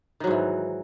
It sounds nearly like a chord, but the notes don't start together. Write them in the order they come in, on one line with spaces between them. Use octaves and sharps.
D#3 F#3 G#2 E3